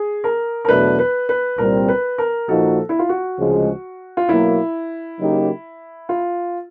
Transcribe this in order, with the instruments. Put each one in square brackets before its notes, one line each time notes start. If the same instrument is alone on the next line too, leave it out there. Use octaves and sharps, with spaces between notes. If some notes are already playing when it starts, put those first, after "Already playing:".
Already playing: [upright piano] G#4
A#4
A#4
[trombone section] E2 B2 F#3 A3 D4 [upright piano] B4
[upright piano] B4
B4
[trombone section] C2 A#2 G3 C4 [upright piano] A#4
[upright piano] B4
A#4
[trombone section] A#2 F3 A#3 D#4 F#4 [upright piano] A4
[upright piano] E4
F4
F#4
[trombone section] D2 C#3 F3 G#3
[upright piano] F4
[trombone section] B2 F#3 A#3 [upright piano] E4
[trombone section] C#3 F#3 A#3 D#4 G4
[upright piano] F4